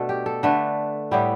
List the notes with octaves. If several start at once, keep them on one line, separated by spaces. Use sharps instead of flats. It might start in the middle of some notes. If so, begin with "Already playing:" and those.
Already playing: B2 A3 D4 A4
G4
A4
D3 A3 D4 B4
A2 G3 B3 E4 G4